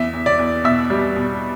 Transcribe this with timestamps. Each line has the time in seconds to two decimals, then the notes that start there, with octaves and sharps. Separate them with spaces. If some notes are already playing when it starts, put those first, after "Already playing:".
Already playing: E2 E5
0.13 E2
0.26 D5
0.39 E2
0.64 B2 E5
0.90 G3
1.16 B2